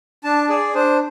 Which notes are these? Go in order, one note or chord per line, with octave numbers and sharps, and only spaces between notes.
D4 A5
G#4 D5
D4 C5